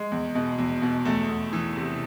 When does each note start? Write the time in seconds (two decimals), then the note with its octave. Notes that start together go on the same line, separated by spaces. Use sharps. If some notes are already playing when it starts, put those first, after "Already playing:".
Already playing: G#3
0.12 E2
0.35 B2
0.58 E2
0.82 B2
1.05 E2 A3
1.29 E2
1.53 E3
1.76 C3